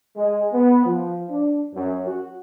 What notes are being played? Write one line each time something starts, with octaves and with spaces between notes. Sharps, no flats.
G#3
B3
F3
D4
F#2
F#4